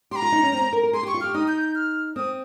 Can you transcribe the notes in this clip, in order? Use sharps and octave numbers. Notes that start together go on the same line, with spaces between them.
G4 A#5 C6
F4
D#4
C#4
C4
C4
A#4
A#4
G#4 C6
G4 C#6
F4
G4 F6
D#4 D#6
G6
G6
F6
C4 D#6